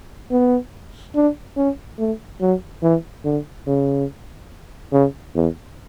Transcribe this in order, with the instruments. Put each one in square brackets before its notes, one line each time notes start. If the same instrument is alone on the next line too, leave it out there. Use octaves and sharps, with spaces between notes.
[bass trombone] B3
D4
C#4
A3
F#3
E3
D3
C#3
C#3
E2